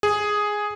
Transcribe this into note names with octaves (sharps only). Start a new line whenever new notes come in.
G#4